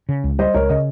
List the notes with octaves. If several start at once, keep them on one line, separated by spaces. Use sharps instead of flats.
C#3
C#2
G3 C5 D#5
C#2 A#4 C#5
C#3 D#5